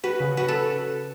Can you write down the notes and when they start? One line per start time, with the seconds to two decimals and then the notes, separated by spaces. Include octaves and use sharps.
0.04 F#4 B4
0.20 C#3
0.37 F#4 B4
0.48 A4